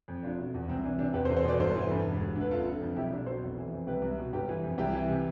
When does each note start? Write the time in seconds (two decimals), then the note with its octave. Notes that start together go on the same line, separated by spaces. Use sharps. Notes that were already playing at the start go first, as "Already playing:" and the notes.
0.08 F2
0.23 F1 D4 F4
0.38 B2
0.54 E2
0.68 C2 C4
0.84 E3 D4
0.99 C3 D4
1.14 E2 G4 B4
1.25 A4 C5
1.30 E2
1.37 A4 C5
1.45 B2 B4 D5
1.60 G1 A4 C5
1.76 E3
1.91 G2
2.05 E1
2.21 D3
2.36 D2
2.41 B4
2.50 F1 F4 A4
2.67 D3
2.82 F2
2.96 B1 E4 G4
3.12 B1 D4
3.26 B2 A4 C5
3.42 F1
3.57 E3
3.73 F2
3.87 C2 G4 B4
4.02 C2
4.18 B2
4.33 G1 G4 B4
4.49 E3
4.63 F2
4.78 C2 E4 G4
4.93 E3
5.09 C3